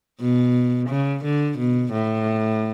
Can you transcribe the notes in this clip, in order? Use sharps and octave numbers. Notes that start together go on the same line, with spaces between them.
B2
C#3
D3
B2
A2